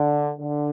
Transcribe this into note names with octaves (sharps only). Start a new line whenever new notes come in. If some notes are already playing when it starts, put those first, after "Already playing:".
Already playing: D3
D3